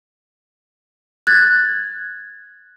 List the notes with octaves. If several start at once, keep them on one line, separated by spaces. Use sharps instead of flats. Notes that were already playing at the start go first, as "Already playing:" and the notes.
F#6 G#6 A6